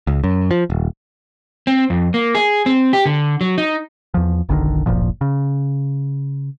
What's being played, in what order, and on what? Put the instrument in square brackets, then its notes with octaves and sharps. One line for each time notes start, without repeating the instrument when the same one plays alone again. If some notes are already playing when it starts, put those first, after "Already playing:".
[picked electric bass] C#2
F#2
F3
D#1
[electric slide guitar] C4
F2
A#3
G#4
C4
G4
D3
F#3
D#4
[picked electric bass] E2 F3
F#1 B1 D3 D#3
D1 G1 A#2 F3
C#3